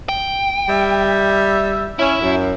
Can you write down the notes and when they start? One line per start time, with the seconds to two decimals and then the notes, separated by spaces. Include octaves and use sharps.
0.09 G5
0.69 G3 E5
1.99 C#4 E4
2.21 F#2